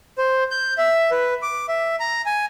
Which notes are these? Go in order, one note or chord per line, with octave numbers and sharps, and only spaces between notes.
C5
G6
E5
B4
D6
E5
A#5
G#5